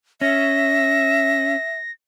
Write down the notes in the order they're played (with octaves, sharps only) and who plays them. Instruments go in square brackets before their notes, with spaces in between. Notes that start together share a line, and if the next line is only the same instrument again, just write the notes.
[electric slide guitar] C#4 [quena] E5 [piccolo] A#6